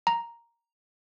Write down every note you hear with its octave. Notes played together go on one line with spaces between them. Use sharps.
A#5